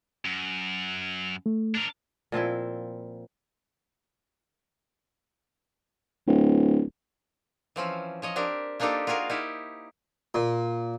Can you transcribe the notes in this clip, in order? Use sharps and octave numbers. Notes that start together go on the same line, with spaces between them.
F#2
A3
D4 A#4
A#2 F3 C4 E4
D1
E3 F3 C4 C#4
F3 C#5 D#5
C4 D4 G4 A#4
A#3 D4 D#4 F4 G4 A4
F4 F#4 G#4 A#4 F5
D#4 E4 G4
A#2